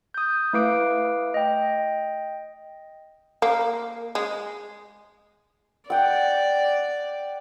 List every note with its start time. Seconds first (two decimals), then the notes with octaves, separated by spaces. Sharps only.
0.14 D#6 G6
0.53 A3 E4 B4 F5 D6 D7
1.34 D#5 G5
3.42 A#3
4.15 G#3
5.90 D5 F#5 G5